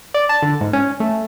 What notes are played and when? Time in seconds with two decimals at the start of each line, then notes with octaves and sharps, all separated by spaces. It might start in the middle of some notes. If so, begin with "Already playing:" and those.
0.14 D5
0.29 A5
0.42 D3
0.61 G#2
0.73 C#4
1.00 A3